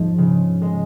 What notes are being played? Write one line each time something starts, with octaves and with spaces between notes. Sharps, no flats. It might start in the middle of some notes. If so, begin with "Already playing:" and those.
Already playing: G#2 F3
C#3
G#3